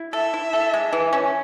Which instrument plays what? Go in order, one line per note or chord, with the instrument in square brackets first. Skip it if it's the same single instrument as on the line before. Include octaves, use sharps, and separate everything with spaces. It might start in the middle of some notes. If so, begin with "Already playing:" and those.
Already playing: [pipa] E4
[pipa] A4 [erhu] E5
[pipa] E4
A4
G#3
E3
C#4